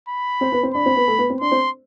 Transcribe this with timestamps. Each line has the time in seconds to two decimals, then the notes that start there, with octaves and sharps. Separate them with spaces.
0.08 B5
0.41 C4 C5
0.52 B3 B4
0.63 C4 C5
0.74 D4 D5 B5
0.86 C4 C5
0.96 B3 B4
1.07 A3 A4
1.19 B3 B4
1.30 C4 C5
1.41 D4 D5 C6
1.52 C4 C5